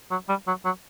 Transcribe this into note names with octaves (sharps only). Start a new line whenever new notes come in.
F#3
G3
F#3
F#3